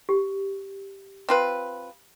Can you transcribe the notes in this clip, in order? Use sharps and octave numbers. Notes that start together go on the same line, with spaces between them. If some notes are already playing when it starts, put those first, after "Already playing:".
G4
C4 F4 B4